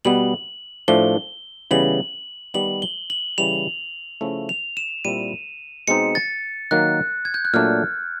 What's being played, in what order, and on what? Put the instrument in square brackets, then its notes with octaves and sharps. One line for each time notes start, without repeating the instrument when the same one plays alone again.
[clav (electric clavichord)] B2 G3 B3 [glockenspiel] F#7
[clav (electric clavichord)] A2 F3 A3 D4 [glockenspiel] G7
[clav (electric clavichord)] C#3 E3 G3 B3 [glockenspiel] F#7
[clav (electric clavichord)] D#3 G3 B3 [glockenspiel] F#7
[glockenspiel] G7
F#7
[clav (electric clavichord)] C#3 E3 G3 [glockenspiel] F7
[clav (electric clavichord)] C#3 F3 A3 C#4 E4
[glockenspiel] F7
E7
[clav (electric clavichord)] A#2 G3 C4 E4 [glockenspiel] D#7
[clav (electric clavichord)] B2 G#3 C4 D#4 [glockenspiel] C#7
[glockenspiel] A6
[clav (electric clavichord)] D#3 F#3 A#3 [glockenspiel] F#6
[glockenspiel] G#6
G6
F#6
[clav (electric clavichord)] A#2 F#3 A3 D4 [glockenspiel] F6